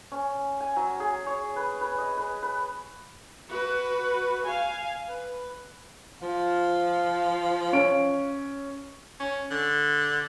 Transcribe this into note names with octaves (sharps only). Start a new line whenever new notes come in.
C#4
G#5
F#3
G#4
C#5
B4
B4
D#5
B4
B4
F#4 B4
F5 G#5
B4
F3 F5
C#4 D7
C#4
D3